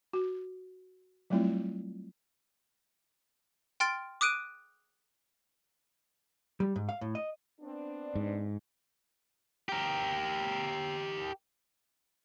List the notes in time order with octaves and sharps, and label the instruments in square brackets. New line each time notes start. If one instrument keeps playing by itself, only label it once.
[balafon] F#4
F#3 G3 A3 C4 E4 F4
[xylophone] G5 C6 F6 A6 D7
D6 D#6 F#6 D7 D#7
[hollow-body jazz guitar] G3
G#2
F5
A2
D#5
[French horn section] B3 C4 D4
[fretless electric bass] G#2
[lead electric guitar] G4 A#4